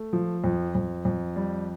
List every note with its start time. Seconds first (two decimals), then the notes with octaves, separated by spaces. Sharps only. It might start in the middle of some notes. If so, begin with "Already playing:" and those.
Already playing: A3
0.13 F3
0.44 F2
0.75 F2
1.05 F2
1.36 G3